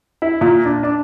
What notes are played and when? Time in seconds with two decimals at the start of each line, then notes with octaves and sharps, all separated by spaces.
0.22 E4
0.41 A#2
0.65 D4
0.83 D4